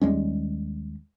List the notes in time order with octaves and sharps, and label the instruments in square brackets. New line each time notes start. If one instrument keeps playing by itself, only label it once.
[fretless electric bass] D#2 G3 G#3 C#4